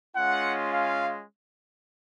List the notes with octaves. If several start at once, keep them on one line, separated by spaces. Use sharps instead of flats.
G#3 C#4 F4 F#5
F5